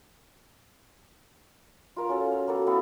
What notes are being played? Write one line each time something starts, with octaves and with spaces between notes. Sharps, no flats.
F4 A#4 F5
C#4 F#4 A4
F5
A#3 B3 F#4 A4
B3 E4 A4 F5